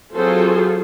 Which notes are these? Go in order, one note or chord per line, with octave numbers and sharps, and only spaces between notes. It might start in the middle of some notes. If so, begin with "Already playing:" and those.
F#3 C4 F4 G#4 A4 C5